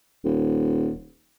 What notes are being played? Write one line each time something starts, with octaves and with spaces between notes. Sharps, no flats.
D#1